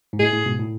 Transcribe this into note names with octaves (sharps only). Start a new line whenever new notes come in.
G#2
A2 G#4
A2
G#2 B2
A2